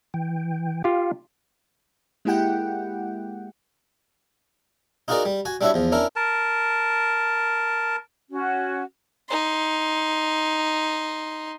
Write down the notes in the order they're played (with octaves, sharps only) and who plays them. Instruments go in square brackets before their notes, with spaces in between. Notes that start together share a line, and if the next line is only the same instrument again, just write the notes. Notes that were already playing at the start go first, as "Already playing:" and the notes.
[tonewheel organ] E3 G5
[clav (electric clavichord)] F4 G4 [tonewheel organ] F5
[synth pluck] G#3 A#3 E4 G4 F#5 G5
[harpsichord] D#4 F4 F#4 G#4 A#4 D5
G3
F#4 G#5
G3 D4 E4 F#4 C#5 E5
E2 F3
C#4 D4 E4 A#4
[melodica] A#4 A5
[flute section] C#4 F#4
[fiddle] D#4 C6